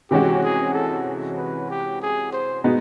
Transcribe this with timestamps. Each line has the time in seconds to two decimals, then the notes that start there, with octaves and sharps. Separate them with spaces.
0.10 C3 E3 G#3 C#4 F#4 G4
0.43 G#4
0.74 A4
1.37 B4
1.70 G4
2.01 G#4
2.32 C5
2.64 B2 G#3 B3 D#4